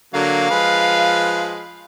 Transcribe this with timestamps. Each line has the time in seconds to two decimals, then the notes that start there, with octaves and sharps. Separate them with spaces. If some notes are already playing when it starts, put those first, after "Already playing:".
0.14 D3 F#3 A#3 F5
0.50 F3 G#3 B4